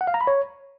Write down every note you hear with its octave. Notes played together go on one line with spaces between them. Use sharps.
F#5
F5
A#5
B5
C#5